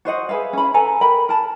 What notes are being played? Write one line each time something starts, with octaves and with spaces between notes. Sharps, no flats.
F#4 C5 D#5 F#5
G#4 B4 E5 F5
C#4 B5
A4 B4 G#5 A#5
A#4 G5 B5
A#4 A5